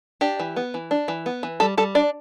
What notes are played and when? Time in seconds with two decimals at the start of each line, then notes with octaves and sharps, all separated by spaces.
0.21 D4 G4
0.40 E3
0.56 B3
0.74 E3
0.91 D4
1.08 E3
1.26 B3
1.43 E3
1.60 G3 A4
1.77 G3 A4
1.95 D4 D5